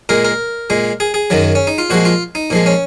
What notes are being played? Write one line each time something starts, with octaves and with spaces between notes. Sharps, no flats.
A#2 G#3 A#4
A#4
A#2 G#3
G#4
G#4
F#2 D#3 F#3
C#4
D#4
F4
A#2 F3 G#3 F#4
F4
D#4
A#2 F3 G#3
C#4